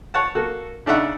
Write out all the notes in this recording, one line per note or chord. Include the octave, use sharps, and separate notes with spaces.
C#5 F#5 A5
A#3 F#4 A4
C#3 D4 D#4 E5 F#5